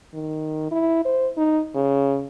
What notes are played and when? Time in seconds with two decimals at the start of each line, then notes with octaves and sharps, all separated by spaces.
0.14 D#3
0.71 E4
1.05 C5
1.37 D#4
1.75 C#3